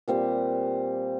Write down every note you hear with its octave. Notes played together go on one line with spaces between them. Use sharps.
A#2 G3 C4